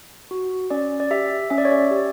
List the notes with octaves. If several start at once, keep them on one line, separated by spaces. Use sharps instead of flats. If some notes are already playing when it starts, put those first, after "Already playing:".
F#4
C#4 D5
D5
G4 E5
C#4 E5
D5
C#5
D5
G4